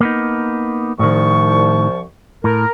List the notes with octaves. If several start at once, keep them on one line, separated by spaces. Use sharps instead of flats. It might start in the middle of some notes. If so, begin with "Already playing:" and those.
A#3 B3 D#4
C2 A2 D#3 F3 C#6
A2 A#4